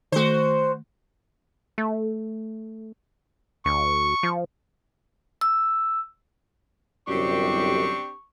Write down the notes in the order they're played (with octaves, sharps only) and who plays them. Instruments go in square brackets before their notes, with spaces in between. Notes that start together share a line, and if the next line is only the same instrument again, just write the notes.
[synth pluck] D#3 A3 [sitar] F#4 C5
[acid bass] A3
[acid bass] D2 [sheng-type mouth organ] C#6
[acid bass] F3
[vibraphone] E6
[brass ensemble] G1 C2 F#2 [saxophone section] C4 D4 G4 [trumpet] C#6